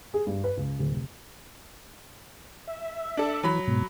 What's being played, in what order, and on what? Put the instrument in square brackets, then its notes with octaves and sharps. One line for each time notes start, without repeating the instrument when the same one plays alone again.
[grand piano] G#4
G2
B4
C#2
D1
F1
[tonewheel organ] E5
[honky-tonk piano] D4 A4
[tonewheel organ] E3 [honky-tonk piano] F#3 B5
[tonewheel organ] G#2 B2